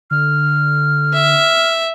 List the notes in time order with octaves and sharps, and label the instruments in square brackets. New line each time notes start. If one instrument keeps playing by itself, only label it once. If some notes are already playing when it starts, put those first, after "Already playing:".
[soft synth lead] D3 [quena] F6
[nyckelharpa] E5